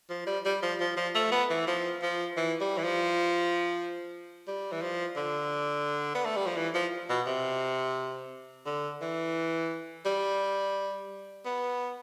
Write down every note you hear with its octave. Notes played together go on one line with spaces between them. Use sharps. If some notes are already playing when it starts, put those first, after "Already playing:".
F3
G3
G3
F3
F3
F3
A3
B3
E3
F3
F3
E3
G3
E3
F3
G3
E3
F3
D3
B3
A3
G3
F3
E3
F3
B2
C3
D3
E3
G3
B3